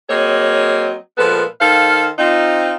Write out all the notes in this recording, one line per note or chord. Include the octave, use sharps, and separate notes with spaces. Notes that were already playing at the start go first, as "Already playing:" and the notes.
F#3 A#3 C4 G#4 C#5 D#5
A#2 F3 G#3 B3 A4 B4
D#3 A4 C5 F5
C4 D#4 F4